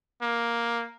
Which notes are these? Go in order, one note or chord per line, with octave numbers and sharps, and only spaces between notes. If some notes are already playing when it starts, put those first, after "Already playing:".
A#3